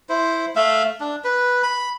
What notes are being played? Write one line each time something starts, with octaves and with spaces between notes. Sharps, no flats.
E4 C5
A3 E5 F5
D4
B4
B5